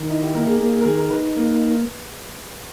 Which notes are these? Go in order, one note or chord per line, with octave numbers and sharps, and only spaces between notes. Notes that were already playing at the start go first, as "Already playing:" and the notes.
Already playing: D#3
D#4 E4
G4
A#3 A#4
G#4
A#3 G#4
G#4
A#4
D#3 G#4
A#4
D#4 B4
A#3